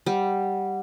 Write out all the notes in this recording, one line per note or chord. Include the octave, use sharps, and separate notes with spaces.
G3 F#5